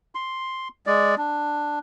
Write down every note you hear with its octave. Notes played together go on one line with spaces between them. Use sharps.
C6
G#3 D5
D4